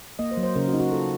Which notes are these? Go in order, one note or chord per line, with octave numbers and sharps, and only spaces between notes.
A#3 D#5
C5
F#3
C5
C#3 A#4
F#4
D#4
F#4
F4 A4